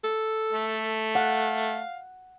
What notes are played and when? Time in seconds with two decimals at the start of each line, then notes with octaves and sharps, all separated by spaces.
0.04 A4
0.53 A3
1.15 F5 F#5